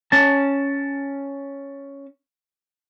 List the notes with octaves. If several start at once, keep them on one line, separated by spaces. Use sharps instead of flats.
C#4 A5